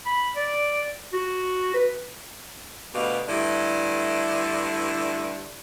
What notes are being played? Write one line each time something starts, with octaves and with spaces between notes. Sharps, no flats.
B5
D5
F#4
B4
D2 B2 G3 F5
G2 D3 A3 E4